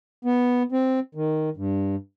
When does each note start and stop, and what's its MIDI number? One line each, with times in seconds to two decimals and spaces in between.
0.25 0.63 59
0.72 1.00 60
1.15 1.50 51
1.57 1.95 43